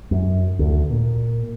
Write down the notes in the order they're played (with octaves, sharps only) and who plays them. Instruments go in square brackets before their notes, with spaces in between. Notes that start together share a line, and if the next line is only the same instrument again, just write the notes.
[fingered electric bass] F#2
D2
A#2